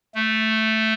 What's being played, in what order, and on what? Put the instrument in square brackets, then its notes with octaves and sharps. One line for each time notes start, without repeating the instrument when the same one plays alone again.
[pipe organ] A3